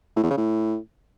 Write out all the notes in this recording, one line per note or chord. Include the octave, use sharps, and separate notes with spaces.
A2
E2
C#3
A2